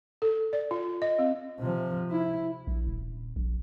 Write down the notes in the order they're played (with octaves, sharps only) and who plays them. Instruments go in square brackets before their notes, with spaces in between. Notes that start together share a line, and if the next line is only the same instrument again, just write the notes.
[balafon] A4
D5
F4
D#5
C4
[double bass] C3 F3
E4
[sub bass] A#1
D#1
A#1